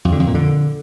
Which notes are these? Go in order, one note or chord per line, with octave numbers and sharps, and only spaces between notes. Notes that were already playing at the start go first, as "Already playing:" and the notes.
F2
D3
F2
A#2
D3